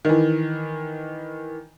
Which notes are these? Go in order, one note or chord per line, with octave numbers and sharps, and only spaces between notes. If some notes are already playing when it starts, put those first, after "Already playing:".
D#3 E3